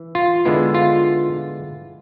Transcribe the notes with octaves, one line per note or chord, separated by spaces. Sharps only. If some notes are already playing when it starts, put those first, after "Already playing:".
Already playing: E3
F4
D3 G#3 B3 E4
F4